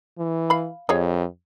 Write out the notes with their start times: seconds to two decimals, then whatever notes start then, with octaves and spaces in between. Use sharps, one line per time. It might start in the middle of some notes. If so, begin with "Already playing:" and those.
0.19 E3
0.50 F5 B5
0.89 F2 G#4 C#5 D#5